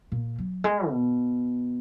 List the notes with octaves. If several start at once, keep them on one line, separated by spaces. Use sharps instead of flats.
A#2
F#3
G#3
B2